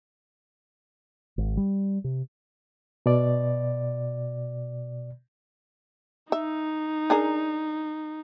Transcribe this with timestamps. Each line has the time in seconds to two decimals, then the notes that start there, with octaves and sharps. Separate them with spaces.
1.38 G#1
1.57 G3
2.04 C3
3.06 B2 D5
6.32 D#4 E5
7.10 D4 G#4 A#4